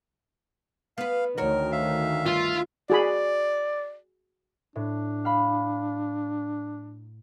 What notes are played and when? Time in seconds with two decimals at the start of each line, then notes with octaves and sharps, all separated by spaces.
0.98 B3 B4 F5
1.38 D2 D#3 F#4 A#4 C#5
1.72 E5 F5
2.26 G2 F4
2.90 F#4 G#4 D5 B5
4.75 A2 D4
5.25 F5 B5